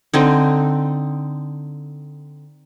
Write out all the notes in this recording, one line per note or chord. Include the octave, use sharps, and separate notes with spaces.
D3 C4 D#4